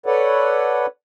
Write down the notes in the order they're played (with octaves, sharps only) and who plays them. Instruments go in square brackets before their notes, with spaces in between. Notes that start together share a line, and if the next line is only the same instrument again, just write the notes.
[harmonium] A4 B4 C#5 D5 F#5